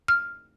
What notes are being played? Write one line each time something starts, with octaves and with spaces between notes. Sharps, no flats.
F6